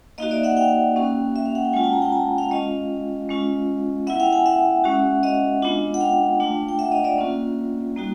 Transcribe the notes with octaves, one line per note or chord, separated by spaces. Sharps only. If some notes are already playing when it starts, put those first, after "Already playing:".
A#3 D#4 F#4 D#5 F5
D5 E5
E5 F#5
F5 G5
A#3 C#4 F#4
E5
F5
F#5
G5
G#3 C#4 F4 F#5 G#5
G5 A5
G#5 A#5
G5 A5
G#5 A#5
F5 G5
G#3 C#4 F4 D#5 F5
G#3 C#4 F4
B3 E4 E5 F#5
F5 G5
F#5 G#5
E5 F#5
G#3 C#4 F#4
D#5 F5
G#3 B3 D4 F4
F#5
F5 G5
A3 D4 F4
G5
E5 F#5
D#5 F5
D5 E5
A#3 C#4 F4
G3 A#3 D#4 F#4